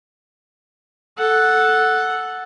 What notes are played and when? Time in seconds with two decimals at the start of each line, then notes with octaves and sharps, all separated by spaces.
1.18 A4 F#5